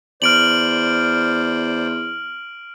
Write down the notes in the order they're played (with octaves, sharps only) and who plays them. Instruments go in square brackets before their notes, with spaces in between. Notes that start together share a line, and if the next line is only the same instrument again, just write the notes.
[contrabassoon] E2 [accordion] C5 D5 [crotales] F6 D7 F#7